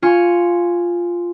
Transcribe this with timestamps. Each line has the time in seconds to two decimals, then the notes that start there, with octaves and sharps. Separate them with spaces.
0.02 F4 F5 G#5 C#6